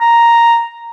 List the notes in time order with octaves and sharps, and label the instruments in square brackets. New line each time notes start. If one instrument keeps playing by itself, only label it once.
[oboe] A#5